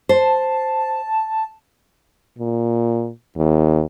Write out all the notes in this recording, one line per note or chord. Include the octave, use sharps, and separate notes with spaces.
C5 A5
A#2
D#2